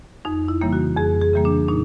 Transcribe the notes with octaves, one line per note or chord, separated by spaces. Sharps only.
F2 D#4
E4
C#3 E3 G3 A#3
F#4
F2 G#4
G#4
C#3 E3 G3 A#3
D4
A#2 D#4